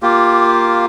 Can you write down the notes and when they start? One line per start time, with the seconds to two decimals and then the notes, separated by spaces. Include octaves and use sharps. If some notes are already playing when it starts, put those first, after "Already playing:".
0.02 A#3 F4 G4